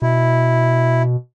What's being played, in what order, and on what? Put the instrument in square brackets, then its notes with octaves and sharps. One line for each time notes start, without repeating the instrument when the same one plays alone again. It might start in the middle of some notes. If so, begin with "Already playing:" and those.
[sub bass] B2 [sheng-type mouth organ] E4